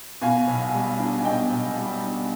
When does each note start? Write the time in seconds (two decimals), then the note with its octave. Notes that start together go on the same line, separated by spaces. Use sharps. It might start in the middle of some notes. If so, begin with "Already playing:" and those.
0.21 B2 F5 G#5
0.48 B1
0.74 G3
0.99 D4
1.18 G#5
1.25 B2 D#5 G5
1.51 B1
1.78 G3
2.03 D4